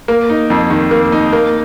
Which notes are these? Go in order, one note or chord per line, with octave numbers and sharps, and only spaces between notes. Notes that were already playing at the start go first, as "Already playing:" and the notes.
A#3
D#4
F2
D#3
A#3
D#4
A#3